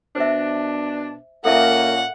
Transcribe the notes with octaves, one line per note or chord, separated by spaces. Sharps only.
B2 D4 C5 E5
A#2 A#3 C#4 A4 E5 F#5 A5